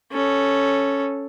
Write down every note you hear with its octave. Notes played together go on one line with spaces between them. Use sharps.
C#4 A4